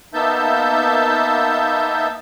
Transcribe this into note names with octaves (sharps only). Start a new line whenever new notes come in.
A#3 B3 D#4 E5 A5 G6